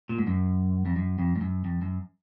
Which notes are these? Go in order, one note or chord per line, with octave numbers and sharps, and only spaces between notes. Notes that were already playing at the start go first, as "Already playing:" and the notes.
A#2
G#2
F#2
F2
F#2
F2
G#2
F#2
F2
F#2